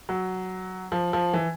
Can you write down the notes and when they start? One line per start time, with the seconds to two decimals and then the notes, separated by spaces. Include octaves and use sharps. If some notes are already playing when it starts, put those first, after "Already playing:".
0.09 F#3
0.92 F3
1.13 F3
1.34 E3